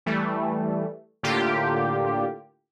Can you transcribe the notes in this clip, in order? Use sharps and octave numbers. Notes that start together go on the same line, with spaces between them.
E3 G3 A3
A2 D3 A#3 F4 G4